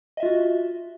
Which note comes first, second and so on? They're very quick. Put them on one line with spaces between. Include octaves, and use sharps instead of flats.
D#5 E5 F4 F#4